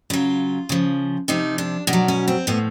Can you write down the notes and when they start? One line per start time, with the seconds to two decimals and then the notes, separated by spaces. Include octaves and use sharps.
0.10 C#3 F#3 F4
0.69 C#3 F3
1.28 C3 F3 D#4
1.58 D4
1.87 B2 D4
1.93 F#3
2.08 C#4
2.28 C4
2.47 A2 F3 B3